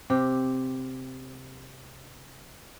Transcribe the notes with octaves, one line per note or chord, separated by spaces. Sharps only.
C3 G4